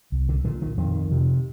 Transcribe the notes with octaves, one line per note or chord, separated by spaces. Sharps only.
C2
D3
A#2 D3
D#3
F2 D#3
C3